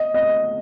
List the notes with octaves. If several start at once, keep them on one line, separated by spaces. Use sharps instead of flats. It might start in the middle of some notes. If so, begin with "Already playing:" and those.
Already playing: D#5
D#5